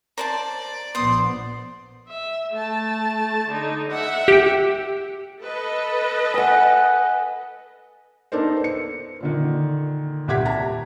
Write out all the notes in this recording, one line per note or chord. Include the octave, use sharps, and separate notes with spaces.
A#4 C5 D5 A5
A#1 B3 C5 C6 D#6
E5
A3 A5
D3 D#4
E5 F#5
G4 G5
A4 B4 D#5
F#5 G#5
B3 D4 D#4 A4 A#4 C5
C#7
A#2 D3 D#3
D#1 C2 G4 F#5 G#6 B6
A5 A#5